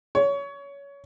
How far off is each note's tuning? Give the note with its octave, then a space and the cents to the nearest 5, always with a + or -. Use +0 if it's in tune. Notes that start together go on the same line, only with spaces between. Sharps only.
C#5 +20